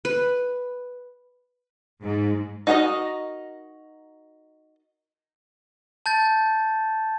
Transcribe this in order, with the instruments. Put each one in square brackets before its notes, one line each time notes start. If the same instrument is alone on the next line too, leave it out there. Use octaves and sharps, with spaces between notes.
[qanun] B4
[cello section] G#2
[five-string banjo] D#4 F#4 A#4 B4 D#5
[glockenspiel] A5 G6 A6